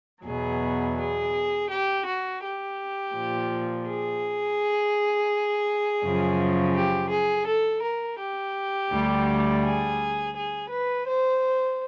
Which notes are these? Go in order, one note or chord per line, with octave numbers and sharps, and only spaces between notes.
E2 B2 F#3 G#4
G#4
G4
F#4
G4
A#2 F3
G#4
F#2 C#3 F3
G4
G#4
A4
A#4
G4
D2 D3 G3
G#4
G#4
B4
C5